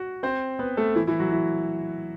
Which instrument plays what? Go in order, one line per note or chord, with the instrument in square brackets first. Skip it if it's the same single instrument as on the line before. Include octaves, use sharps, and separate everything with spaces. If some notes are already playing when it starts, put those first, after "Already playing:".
Already playing: [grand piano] F#4
C4 C5
B3 B4
A3 A4
E3 E4
E3 E4
F#3 F#4
E3 E4